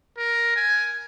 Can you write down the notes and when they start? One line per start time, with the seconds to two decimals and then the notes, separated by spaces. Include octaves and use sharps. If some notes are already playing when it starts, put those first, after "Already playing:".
0.18 A#4
0.56 G#5